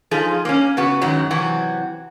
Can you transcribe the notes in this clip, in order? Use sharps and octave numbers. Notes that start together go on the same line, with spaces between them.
F3 D#4 F4 G#4 A4
A#3 C#4
C#3 B3 F#4
F#2 D#3 F#3 G#3
C3 E3 F#3 F#4